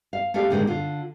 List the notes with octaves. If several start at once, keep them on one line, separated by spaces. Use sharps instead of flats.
F5
A3 C#4 G4 A4 F5
D#2 A2 D3 G#3 A#3 C4
D3 F4